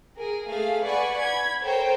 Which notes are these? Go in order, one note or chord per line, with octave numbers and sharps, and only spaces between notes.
G#4 A#4
A3 G#4 F5
B4 D5 F#5 G#5 B5 C#6
B5 G#6
A4 A#4 C5 C#5 G5